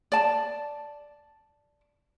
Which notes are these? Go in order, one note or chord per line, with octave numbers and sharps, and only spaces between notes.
D5 A5